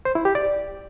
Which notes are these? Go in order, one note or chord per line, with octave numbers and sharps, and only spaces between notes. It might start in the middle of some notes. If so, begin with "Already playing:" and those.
C5
E4
G4
D5